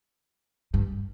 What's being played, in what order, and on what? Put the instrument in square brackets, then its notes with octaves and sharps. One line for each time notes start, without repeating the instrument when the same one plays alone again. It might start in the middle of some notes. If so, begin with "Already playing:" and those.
[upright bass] G2